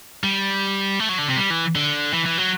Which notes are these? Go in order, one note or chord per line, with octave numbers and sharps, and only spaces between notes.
G3
A3
F#3
D3
C3
G3
E3
D3
E3
E3
F#3